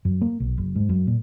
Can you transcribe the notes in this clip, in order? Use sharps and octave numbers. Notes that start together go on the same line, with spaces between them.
F#2
A#3
B1
F#1
G#2
F#2
A#2